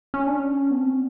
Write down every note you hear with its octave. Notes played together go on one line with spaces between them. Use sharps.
C#4
D4
C#4
B3
C4